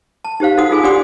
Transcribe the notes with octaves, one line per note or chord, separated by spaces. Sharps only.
A5
D#4 G4 C5 F5
D#4 F#4 A4 F#5 D#6
D#4 F4 G#4 A4 F5 G#5
D4 G4 D5 F#5 C6 D#6